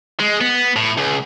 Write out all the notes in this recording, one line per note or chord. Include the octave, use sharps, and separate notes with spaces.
G#3
B3
A2
C#2